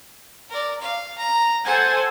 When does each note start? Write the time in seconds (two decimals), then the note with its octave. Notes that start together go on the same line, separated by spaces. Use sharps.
0.50 A#4 D5
0.81 F5
1.18 A#5
1.65 A4 C5 F#5 G#5